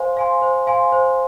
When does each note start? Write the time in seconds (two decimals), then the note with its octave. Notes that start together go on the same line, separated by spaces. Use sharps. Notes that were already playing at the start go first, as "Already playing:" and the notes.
Already playing: C5 F5 G#5 C6
0.17 F5 G#5 C6
0.42 C5
0.67 F5 G#5 C6
0.92 C5